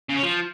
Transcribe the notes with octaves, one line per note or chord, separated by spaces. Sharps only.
C#3
C#4
F3